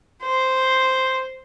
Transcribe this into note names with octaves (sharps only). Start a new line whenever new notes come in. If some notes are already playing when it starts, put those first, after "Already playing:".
C5